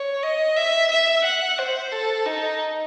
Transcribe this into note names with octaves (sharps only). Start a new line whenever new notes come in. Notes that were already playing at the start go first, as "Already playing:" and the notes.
Already playing: C#5
D#5
E5
E5
F#5
C5
A4
D#4